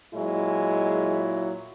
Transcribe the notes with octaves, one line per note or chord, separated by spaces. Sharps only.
A#2 F#3 G#3 E4